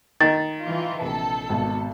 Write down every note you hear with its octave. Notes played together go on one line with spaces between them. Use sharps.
D#3 A6
E3 F4
A#1 C3 A4
G#1 B2 A5